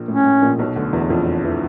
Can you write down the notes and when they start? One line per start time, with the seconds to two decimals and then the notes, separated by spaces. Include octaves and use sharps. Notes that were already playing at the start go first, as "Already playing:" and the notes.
Already playing: A#1 A#2
0.08 A2 C#4
0.25 A2
0.42 A#1 A#2
0.59 B1 B2
0.76 D2 D3
0.93 E2 E3
1.10 F2 F3
1.44 E3